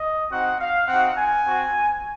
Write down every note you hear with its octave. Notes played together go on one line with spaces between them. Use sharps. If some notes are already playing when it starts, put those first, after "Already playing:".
Already playing: D#5
C4 D#4 F#4 F#5
F5
C4 D#4 F#4 F#5
G#5
C4 F#4